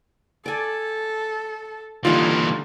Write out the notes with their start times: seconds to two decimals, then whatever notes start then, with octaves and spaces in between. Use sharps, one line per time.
0.46 A4 D5 G#5
2.05 A#2 D3 E3 G3 D#4 F4